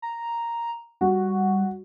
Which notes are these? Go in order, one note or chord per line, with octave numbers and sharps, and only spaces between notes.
A#5
G3 F#4